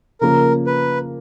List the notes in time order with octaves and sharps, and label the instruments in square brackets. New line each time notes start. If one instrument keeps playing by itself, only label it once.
[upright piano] C#3 F3 A#3 [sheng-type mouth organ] A#4
[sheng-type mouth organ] B4